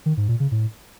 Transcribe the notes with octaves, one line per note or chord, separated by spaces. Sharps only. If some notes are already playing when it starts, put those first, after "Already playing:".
D#3
G#2
A#2
C#3
A2